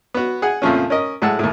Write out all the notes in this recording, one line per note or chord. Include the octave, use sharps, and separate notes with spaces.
B3 F#4
G#4 F#5 G#5
F2 A#2 C#3 F3 A3 C#4
C#4 A#4 D#5
A2 G#3 F#5 A5 E6
D#2 A2